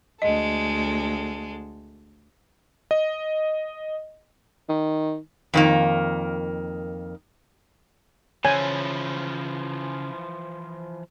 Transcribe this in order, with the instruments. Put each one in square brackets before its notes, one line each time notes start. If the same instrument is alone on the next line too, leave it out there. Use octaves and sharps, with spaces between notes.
[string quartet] D2 G#3 A4 [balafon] D#5
[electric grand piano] D#5
[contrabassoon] D#3
[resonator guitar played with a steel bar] F2 D#3 A#3
[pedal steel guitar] C#3 [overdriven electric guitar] E3 F3 [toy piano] C#5 [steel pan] G#5